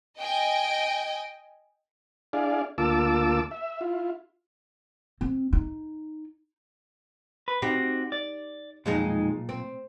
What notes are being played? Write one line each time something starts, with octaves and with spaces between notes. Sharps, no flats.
D#5 G5 G#5
D4 E4 G#4 D5 F5
D2 A#3 F4 A5 D6 E6
E5
E4 F4
C4
D#4
B4
C4 D#4 F#4 G4
D5
B1 F2 A#2 G#3 D#4
C4